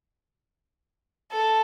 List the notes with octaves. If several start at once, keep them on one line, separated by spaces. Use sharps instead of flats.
A4